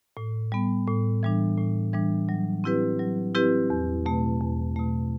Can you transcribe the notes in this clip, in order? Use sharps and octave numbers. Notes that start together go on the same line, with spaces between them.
A2
G3 B3
A2
E3 G3 D4
A2
E3 G3 D4
F#3
C4 E4 G4 B4
F#3
C4 E4 G4 B4
E2
B2 A3
E2
B2 A3